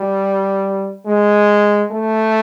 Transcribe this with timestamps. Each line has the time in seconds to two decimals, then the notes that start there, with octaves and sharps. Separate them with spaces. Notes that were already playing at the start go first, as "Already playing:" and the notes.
Already playing: G3
1.06 G#3
1.91 A3